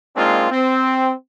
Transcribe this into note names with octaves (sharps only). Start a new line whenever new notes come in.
G#3 A#3 C4 D4 D#4 F4
C4